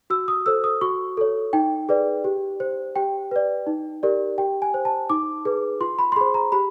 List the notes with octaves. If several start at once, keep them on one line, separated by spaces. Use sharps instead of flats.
F#4 E6
D#6
A4 C5 E6
D#6
F#4 C#6
A4 C#5
D#4 G5
G#4 B4 D5
G4
C5
G4 G5
B4 D5
D#4
G4 A#4 D5
G4 G5
G#5
C5
A5
D#4 D6
G#4 B4
F4 C6
B5
C6
G#4 C5 B5
A#5
G4 B5